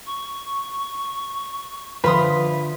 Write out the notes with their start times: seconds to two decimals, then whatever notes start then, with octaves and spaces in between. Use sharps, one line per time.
0.06 C#6
2.04 D3 F3 B4 E5 F5 C6 D#6